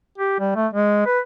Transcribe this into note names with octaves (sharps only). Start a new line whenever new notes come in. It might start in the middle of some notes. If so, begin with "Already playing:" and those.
G4
G3
A3
G#3
B4